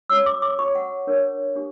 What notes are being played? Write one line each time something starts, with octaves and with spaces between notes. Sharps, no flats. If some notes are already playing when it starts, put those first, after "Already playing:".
C#4 F#4 C#5 E6
D6
D6
F#4 C#5 C#6
F#5
D4 A#4 C#5
D4 G4